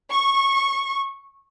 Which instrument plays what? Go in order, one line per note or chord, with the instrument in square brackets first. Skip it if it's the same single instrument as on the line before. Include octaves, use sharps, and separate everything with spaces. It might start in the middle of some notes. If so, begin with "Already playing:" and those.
[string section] C#6